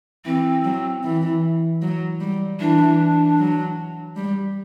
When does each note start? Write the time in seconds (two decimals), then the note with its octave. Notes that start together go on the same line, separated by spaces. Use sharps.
0.25 E3 C4
0.65 F#3
1.04 E3
1.82 F#3
2.20 G3
2.60 E3 D4
3.39 F#3
4.16 G3